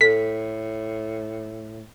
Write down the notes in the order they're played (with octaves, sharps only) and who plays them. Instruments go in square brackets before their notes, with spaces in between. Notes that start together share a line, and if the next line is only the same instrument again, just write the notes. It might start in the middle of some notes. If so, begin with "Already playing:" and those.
[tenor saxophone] A2 [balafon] A4 [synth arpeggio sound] B6